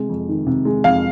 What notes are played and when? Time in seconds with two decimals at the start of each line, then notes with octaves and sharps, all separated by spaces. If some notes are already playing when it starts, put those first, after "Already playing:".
Already playing: C3 G#3
0.09 F2
0.29 D#3
0.47 C3
0.65 G#3
0.84 F2 F5